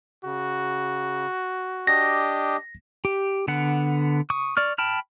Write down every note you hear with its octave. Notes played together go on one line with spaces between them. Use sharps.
C#3 F#4
D4 G4 D#5 A#6
G4
D3 B3 F#5
C#6 D#6
D5 C#6 F6
G5 A5 B5 F6